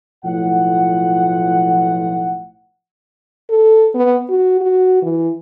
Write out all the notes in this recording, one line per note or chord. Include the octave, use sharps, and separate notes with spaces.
B1 A2 F3 F4 F#5
A4
B3
F#4
F#4
E3